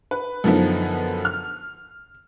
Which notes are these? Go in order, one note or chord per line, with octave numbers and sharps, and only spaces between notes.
B4
F#2 D3 F3 B3 D#4
F6